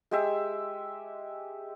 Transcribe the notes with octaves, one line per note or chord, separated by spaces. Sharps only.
G#3 G4 E5